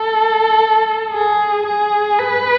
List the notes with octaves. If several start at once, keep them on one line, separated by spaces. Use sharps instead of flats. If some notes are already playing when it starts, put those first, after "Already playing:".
Already playing: A4
G#4
G#4
B4